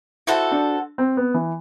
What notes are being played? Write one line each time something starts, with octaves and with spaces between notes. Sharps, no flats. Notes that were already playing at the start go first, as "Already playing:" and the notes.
E4 F#4 A4 C5 F#5
D4
C4
B3
E3